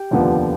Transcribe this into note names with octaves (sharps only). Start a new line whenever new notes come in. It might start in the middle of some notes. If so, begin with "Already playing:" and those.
Already playing: G4 G5
F1 D#2 D3 F3 B3